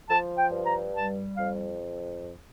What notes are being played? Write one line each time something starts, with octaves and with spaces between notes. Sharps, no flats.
F3 A5
G5
G2
A#5
G3 A5
F2 F5